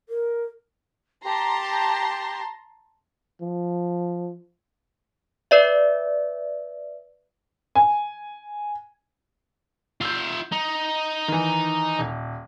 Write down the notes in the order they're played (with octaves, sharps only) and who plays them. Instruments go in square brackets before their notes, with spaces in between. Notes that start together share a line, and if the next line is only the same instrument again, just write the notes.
[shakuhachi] A#4
[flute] G4 [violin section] A5 A#5 C6
[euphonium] F3
[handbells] B4 D5 E5
[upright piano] G#5
[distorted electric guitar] F4 E5 [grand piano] G6 C7
[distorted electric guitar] D#4
[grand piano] D#3 E3
D#1